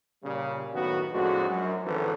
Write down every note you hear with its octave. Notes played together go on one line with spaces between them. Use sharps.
A#2 C#3 G3
F#2 A2 D#3 B3 F#4 B4
F2 A2 G#3 D4 F#4
F#2
G#1 D3 E3 C#4 A4 B4